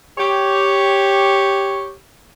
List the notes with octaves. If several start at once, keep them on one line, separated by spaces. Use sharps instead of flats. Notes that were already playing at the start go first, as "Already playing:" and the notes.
G4 C#5